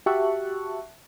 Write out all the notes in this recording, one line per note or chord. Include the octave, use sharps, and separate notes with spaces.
F#4 G4 E5 A5 C#6 F#6